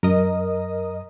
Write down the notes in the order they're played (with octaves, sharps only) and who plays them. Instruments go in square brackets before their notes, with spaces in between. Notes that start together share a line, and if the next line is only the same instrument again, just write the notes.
[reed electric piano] F#2 [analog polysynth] A#4 D#5 D#6